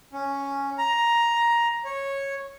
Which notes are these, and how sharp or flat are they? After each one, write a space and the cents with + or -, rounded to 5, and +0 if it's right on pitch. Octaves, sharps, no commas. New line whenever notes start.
C#4 +0
A#5 +10
C#5 -10